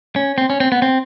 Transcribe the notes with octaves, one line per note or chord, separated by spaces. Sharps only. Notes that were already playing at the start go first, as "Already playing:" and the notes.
C#4
C4
C#4
C4
B3
C4